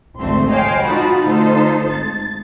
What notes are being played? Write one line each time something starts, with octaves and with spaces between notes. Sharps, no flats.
G#1 D2 G#2 A3 C4 C6
C5 C#5 D#5 F5 G5 G#5
D#4 F4 F#4 F#5 A5 B5
D3 A3 D#4 F4 A4 C5
G#1 A6